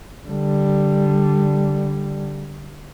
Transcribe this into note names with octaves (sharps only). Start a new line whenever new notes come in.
D3 G3